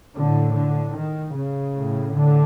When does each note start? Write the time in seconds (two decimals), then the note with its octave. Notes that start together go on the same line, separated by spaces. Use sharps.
0.17 A2 D3
0.57 D3
0.97 D#3
1.36 C#3
1.75 A2
2.14 D3